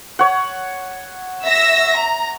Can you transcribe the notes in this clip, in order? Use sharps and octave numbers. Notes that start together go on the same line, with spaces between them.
C#5 F#5
E5 E6 A#6
A#5